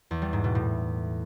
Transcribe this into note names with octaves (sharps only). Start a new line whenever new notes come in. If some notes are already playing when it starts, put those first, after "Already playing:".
E2
G3
G#2
B2
A2